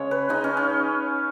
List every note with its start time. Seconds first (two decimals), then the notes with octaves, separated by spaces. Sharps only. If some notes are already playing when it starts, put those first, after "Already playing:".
Already playing: C#3 G#3 C#5
0.11 B4
0.29 C#3 G#3 D#4
0.44 C#4
0.57 C#4